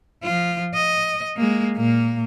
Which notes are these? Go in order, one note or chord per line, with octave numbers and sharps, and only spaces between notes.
F3 F4
D#5
G#3 A#3
A#2 A#3